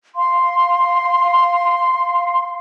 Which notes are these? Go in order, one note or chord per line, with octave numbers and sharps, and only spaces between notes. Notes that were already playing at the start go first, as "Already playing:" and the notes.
F5 C6